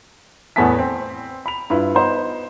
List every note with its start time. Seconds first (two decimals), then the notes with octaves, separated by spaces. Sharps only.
0.56 E2 A2 B3 G#5 A5 B6
0.79 C4
1.46 B5 F7
1.70 G2 E4 F4 B4
1.95 B3 D#4 C5